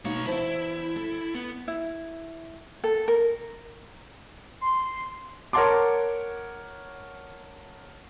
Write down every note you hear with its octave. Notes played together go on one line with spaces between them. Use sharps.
B2 A#3 D#4 F#4 C#5
E2 E4 C5 A5
A4
B3
E4
A4
A#4
C6
A#4 C#5 F#5 A5 C6 D6